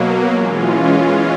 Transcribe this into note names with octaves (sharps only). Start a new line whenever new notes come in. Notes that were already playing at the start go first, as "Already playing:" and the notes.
Already playing: B2 F#3 A#3
E3 G#3 C#4 F4